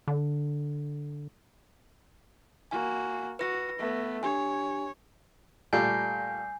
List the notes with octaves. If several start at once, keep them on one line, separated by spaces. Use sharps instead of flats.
D3
A#3 F#4 G#5
F#4 B4 A#6
A3 B3
D4 G4 C#5 G#5
A#2 G3 A3 G#5 G6 C7